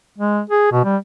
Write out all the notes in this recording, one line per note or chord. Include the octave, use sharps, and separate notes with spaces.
G#3
G#4
B2
G3